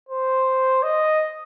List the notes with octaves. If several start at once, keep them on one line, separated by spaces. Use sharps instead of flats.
C5
D#5